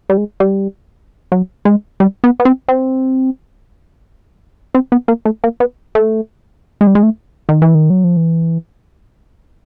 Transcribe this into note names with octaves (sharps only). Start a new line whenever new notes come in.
G3
G#3
G3
F#3
G#3
G3
B3
B3
C4
C4
C4
B3
A#3
A3
A#3
B3
A3
G#3
G3
G#3
A3
D#3
E3
D#3
F#3
F3
E3